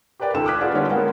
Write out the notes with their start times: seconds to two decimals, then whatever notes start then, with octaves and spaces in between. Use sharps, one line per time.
0.20 G4 A#4 B4 D5 G5
0.34 C#2 D#3 A4 E6 E7
0.46 D6 D#6 F6 F#6 G#6 B6
0.61 F4 G#4 B4 D5 F#5
0.74 D3 D#3 G3 B3 C#4 D4
0.90 G#3 A#3 B3 F#5 G5